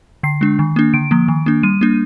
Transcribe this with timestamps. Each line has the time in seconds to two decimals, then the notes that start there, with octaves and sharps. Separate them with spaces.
0.23 D3 C7
0.41 G#3 D4
0.59 D#3
0.76 A#3 D4
0.94 D3 D7
1.11 F3 A#3
1.28 D#3
1.46 A#3 D4
1.63 G3 D#7
1.81 A#3 D4